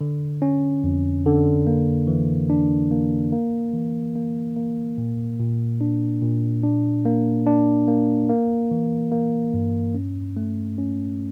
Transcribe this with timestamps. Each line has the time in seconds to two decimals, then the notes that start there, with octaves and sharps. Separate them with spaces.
0.01 D3
0.42 C#4
0.84 F2
1.26 D3
1.67 A#3
2.07 E3
2.50 D4
2.91 A#3
3.32 A#3
3.73 E3
4.15 A#3
4.57 A#3
4.98 A#2
5.39 A#2
5.81 D4
6.22 A#2
6.64 D4
7.05 A#3
7.46 D4
7.88 A#3
8.29 A#3
8.71 E3
9.12 A#3
9.54 G2
9.94 C#4
10.37 A3
10.78 C#4